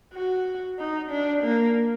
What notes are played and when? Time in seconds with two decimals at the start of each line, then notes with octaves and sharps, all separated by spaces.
0.13 F#4
0.79 D#4
1.10 D4
1.43 A#3